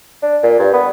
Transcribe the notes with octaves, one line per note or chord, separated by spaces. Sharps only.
D4
A#2
G2
B3